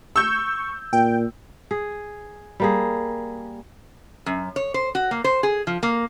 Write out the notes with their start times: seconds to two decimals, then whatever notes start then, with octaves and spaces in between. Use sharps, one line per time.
0.16 C#6 E6 G6
0.93 A#2 G5
1.71 G#4
2.60 G3 A#3 G#4
4.26 F#2
4.56 C#5
4.74 C5
4.95 F#4
5.11 A#3
5.24 C5
5.43 G#4
5.67 F3
5.83 A#3